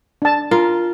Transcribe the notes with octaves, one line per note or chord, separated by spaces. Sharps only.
D4 A5
F4 A#4